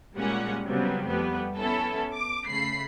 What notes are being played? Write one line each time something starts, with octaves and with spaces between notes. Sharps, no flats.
A#2 G3 G#3 C#4 F#5
C#3 F#3 G3 B3 C4
F2 G3 A3 B3
B3 C#4 E4 A4
D6
C#3 A3 B5 C7